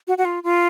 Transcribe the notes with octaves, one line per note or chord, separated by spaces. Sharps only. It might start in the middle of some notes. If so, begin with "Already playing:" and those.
F#4
F#4
F4
F4